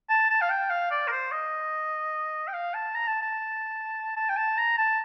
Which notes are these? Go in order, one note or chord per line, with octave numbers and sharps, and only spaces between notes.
A5
A5
F5
G5
F5
D5
A#4
C5
D#5
G5
F5
A5
A#5
A5
A5
A5
G5
A5
A#5
A5